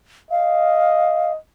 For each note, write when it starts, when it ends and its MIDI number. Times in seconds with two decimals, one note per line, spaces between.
0.31 1.38 75
0.31 1.32 77